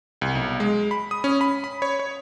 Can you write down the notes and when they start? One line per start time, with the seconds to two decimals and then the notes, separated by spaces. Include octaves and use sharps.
0.22 C2
0.35 B1
0.60 G#3
0.91 B5
1.11 D#6
1.24 C#4
1.41 B5
1.64 B5
1.82 C#5
1.99 C#5